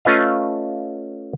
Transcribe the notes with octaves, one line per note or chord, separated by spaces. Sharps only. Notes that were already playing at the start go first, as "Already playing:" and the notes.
A3 C#4 F4 B4 D#5 F5